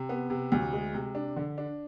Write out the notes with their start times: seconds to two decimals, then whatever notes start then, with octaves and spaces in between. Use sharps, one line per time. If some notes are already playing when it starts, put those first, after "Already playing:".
Already playing: C3
0.09 B3
0.30 C3
0.52 D2
0.73 G#3
0.94 C3
1.15 D4
1.36 D3
1.58 D4